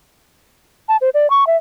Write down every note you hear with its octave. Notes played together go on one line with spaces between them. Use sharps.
A5
C5
D5
C#6
E5